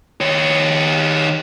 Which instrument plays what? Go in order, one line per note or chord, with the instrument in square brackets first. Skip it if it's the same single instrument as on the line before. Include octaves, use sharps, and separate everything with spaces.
[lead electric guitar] D#3 C#5